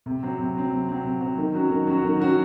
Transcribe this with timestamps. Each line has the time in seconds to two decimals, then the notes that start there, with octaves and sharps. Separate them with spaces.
0.06 C3
0.23 F#3 C4
0.39 C3
0.56 F#3 C4
0.72 C3
0.88 F#3 C4
1.05 C3
1.21 F#3 C4
1.38 D#3
1.54 F#3 C#4 F#4
1.70 D#3
1.87 F#3 C#4 F#4
2.04 D#3
2.19 F#3 C#4 F#4